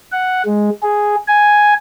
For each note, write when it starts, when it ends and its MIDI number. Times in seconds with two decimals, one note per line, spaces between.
0.12 0.42 78
0.46 0.70 56
0.83 1.16 68
1.28 1.74 80